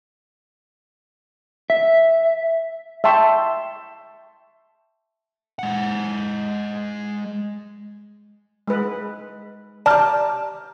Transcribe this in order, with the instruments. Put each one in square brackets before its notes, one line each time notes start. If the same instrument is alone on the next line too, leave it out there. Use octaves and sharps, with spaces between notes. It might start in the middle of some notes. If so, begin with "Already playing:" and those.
[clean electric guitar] E5
[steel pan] E5 G5 A5 C6 C#6
[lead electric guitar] G#3 F#5
[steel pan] G#3 B4
[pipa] G4 A5 [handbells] D5 A#5 F6